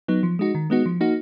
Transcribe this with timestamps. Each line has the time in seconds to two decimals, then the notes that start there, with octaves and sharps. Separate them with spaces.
0.08 F#3 B3 D#4
0.23 F3
0.39 G#3 D#4 F#4
0.55 D#3
0.70 G#3 B3 D#4 F#4
0.86 F3
1.01 A#3 D#4 F#4